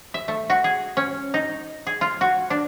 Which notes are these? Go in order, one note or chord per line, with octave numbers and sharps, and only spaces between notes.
E5
A3
F#4
G#4
C#4
D#4
G#4
F4
F#4
D4